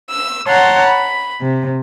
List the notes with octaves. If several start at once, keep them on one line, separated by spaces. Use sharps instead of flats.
E6
C#5 F#5 A5 A#5 C6
B5
C3